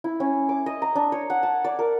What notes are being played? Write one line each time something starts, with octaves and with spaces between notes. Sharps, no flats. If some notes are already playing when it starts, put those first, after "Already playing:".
E4
C#4
D6
D#5
A#5
D4
C#5
F#5
A5
D5
A#4